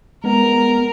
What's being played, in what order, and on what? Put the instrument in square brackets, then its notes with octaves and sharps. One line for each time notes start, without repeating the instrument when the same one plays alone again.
[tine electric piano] G#3 B3 [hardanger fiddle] A#4